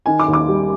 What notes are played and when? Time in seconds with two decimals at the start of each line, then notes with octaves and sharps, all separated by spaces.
0.06 D#3 G#5
0.20 D6
0.28 D#2
0.33 D6
0.48 G3